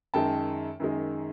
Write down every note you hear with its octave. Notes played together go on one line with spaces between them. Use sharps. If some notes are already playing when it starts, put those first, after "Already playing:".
F#2 D#3 G#3 G5 A5
F#2 D#3 G#3